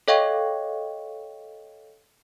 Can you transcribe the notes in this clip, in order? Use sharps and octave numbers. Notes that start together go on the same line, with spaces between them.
A4 C#5 D#5 F5 G5 C#6